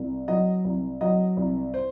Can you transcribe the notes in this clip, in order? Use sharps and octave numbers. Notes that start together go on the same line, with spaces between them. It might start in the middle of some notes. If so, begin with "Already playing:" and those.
Already playing: C2
F#3 D#5
C2
F#3 D#5
C2
C5